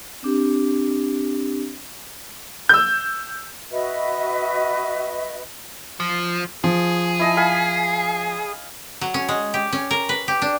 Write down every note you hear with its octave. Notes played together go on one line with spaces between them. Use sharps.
C4 D4 G4
E6 G6
F#4 B4 D#5 E5
F3
F3 G#4
E4 D#5 A5
F5 G#5 B5
F#3
C#4
G#3
G4
C#4
A#4
B4
G4
D4